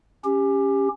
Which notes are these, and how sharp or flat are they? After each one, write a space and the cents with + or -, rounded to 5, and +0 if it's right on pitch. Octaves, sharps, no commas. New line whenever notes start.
C#4 +0 G4 +15